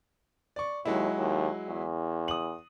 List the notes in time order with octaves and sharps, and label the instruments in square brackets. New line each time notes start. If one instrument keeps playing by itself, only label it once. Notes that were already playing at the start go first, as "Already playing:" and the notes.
[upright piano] D5 C#6
[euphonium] D#2 [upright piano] F#3 G#3 E4
[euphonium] D#2
E2
[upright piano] D#6 F#7